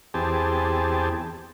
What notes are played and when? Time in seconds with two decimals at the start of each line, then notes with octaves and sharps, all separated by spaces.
0.14 E2 C4 G4 G#4 A5